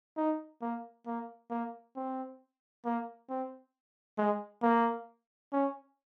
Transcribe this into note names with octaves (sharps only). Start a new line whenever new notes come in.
D#4
A#3
A#3
A#3
C4
A#3
C4
G#3
A#3
C#4